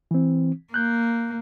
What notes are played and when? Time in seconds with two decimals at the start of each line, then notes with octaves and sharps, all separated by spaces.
0.11 E3 C4
0.74 A#3 F#6 G6